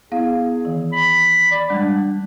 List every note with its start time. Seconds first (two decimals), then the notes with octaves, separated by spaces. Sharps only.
0.12 B3 E4 G#4 F5
0.65 D#3 E3
0.92 B5
1.52 D5
1.70 G3 G#3 D4